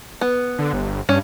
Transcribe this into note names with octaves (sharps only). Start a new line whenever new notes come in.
B3
D3
G1
G2 C#4